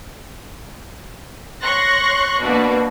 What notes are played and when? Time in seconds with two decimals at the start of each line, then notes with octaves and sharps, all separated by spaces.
1.62 C#5 C6 C#6 F#6 A#6
2.41 B2 A#3 D4 F#4